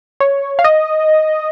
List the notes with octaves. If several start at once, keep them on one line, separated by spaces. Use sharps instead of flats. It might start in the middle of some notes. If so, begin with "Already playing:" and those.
C#5
F5
D#5